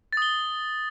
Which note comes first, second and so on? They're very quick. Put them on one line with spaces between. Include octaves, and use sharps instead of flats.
A6 D#6 G7